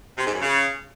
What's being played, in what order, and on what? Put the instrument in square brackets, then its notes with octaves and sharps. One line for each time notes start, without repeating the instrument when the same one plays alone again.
[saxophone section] C3
G#2
F#2
C#3